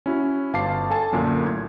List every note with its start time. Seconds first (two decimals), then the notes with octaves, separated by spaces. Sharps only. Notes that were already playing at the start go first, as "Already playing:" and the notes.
0.06 C#4 E4 F#4
0.53 G1 F5 A5 D6 C7
0.90 A4 G#5 A5
1.12 A#1 F#2 A#2 D3
1.44 A2 G#6